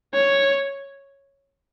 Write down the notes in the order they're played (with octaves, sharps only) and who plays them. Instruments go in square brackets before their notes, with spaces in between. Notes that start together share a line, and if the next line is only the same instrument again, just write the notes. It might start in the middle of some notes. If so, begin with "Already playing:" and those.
[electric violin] C#5